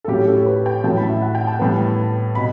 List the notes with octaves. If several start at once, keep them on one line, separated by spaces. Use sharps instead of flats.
A4
A2 F#3 A3 C#4 G4
G4
A4
C#5
B4
G5
A2 F#3 A3 C#4 A5
B5
E5
F#5
G5
A5
A2 G3 B3
B2 B5